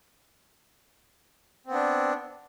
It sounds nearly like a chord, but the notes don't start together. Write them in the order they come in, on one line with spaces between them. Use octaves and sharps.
C4 B3 D4